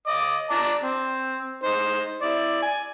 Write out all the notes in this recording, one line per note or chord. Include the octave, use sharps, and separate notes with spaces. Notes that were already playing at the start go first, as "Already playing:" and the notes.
D#5 D6
D5 A5 A#5
C4
D#4 C5
E4 D5
G#5